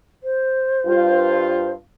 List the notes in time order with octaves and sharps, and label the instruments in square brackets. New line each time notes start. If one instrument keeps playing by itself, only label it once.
[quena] C5
[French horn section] G2 F4